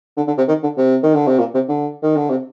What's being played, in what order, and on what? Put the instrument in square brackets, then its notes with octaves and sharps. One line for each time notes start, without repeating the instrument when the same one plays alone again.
[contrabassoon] D3
D3
C3
D#3
D3
C3
D#3
D3
C3
A#2
C3
D3
D#3
D3
C3